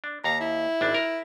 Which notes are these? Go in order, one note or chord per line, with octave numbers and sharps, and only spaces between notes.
D4
D#2 F5 A#5
E4
G#1 D4
A#4